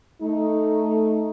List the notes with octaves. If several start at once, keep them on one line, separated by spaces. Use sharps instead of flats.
A3 D#4